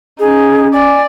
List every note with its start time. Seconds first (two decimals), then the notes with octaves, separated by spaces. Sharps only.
0.19 C#4 D#4 G#4
0.73 D5 G#5